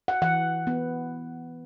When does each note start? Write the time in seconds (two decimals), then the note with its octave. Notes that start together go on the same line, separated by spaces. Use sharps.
0.08 F#5
0.22 E3 F#5
0.67 B3